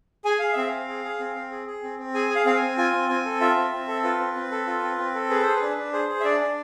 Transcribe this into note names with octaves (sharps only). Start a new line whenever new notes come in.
G#4 G#5
G#4 F5
C4 E5
F5
C4
G#4
G#4
C4
C4
G#4
G#4
C4
C4
G#4 G#5
G#4
F5
C4 F5
G#5
C4
F4 G#5
C4
C4 G#5
A4
F4 E5
C4
C4
A4
F4 B4
C4
C4
A4
F4
C4
C4
A4
G#4 B4
G#4 C5
B4
D4
D4
G#4 C5
G#4
E5
D4 D5
D4